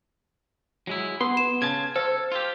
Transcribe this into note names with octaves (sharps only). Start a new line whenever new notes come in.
F#3 G#3 E4
B3 C6
E7
C#3 A5 G#6
A4 C5
F4 G4